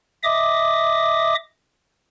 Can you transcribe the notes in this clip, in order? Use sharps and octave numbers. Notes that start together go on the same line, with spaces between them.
D#5 E5 D6 D#6